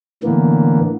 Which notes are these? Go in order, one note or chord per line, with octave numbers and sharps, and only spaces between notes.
A2 D3 E3 A#3 B3